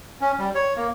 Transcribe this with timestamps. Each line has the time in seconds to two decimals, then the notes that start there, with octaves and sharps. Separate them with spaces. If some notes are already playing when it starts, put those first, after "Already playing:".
0.21 C#4
0.39 G3
0.55 C#5
0.76 A#3